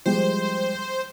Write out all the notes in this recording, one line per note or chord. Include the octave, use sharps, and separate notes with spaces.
F3 G3 G#3 C5